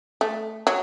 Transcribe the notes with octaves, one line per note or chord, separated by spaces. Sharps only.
A3
F#3